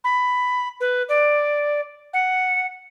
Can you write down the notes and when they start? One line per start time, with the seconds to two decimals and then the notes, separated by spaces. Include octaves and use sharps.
0.04 B5
0.80 B4
1.09 D5
2.13 F#5